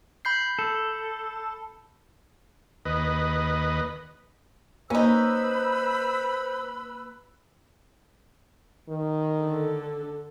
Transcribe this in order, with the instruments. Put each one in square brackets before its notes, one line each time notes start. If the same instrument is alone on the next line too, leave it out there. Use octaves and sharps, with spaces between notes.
[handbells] B5 G6 C7
[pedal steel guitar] A4
[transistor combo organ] D#2 B4 D#5
[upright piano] A#3 [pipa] C#4 D#4 [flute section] B4 B5 E6 [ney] C5
[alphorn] D#3
[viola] D3 A4